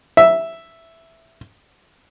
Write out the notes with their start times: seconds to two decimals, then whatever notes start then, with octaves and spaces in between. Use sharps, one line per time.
0.17 E5